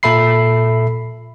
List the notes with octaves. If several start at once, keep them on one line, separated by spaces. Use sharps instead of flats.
A#2 A4 E5 B5 C7